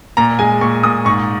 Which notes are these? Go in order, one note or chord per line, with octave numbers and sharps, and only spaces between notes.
A#2 A#5
G#3 G#5
A#2 C#6
A#2 D#6
G#2 C#6